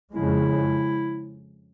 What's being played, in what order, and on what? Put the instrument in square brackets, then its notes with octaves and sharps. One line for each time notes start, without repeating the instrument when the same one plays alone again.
[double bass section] F2 C#3 F3 G#3 [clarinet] E4